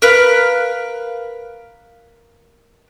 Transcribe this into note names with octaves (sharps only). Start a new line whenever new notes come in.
A#4 B4 F5